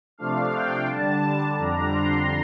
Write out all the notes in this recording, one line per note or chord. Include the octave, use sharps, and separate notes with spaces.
C3 F3 A3 D4 F5
G5
D3 G3 D4 A5
F2 D3 G3 D4 A#5
C6